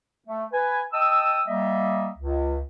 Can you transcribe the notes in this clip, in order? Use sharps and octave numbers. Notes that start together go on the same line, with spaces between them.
A3
B4 G#5
D#5 G5 A5 D#6 E6
G3 A#3 D#5 E5
C#2